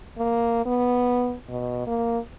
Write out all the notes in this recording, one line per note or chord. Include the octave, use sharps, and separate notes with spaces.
A#3
B3
B2
A#3